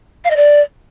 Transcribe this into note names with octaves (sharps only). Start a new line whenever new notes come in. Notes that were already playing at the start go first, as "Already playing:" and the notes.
F5
D#5
D5